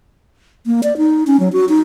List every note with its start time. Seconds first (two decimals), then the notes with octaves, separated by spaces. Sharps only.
0.66 A#3
0.83 D5
0.97 D#4
1.27 C#4
1.40 F#3
1.53 F#4
1.69 D#4